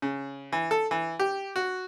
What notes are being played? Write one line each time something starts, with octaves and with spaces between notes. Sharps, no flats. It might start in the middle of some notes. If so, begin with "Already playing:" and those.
C#3
E3
A4
E3
G4
F#4